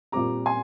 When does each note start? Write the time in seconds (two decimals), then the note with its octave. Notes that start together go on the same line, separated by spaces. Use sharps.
0.12 A#2 G3 C4 G4 A#5 D6
0.46 G#5 C6